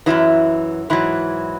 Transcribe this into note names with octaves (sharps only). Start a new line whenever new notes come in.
F#2 C#3 E3 F#3 E4
G#2 E3 F#3 E4